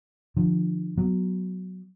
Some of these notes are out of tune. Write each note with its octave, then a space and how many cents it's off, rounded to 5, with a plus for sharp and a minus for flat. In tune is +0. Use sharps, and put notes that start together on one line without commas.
D3 +40 F3 +0
F#3 +0 B3 +0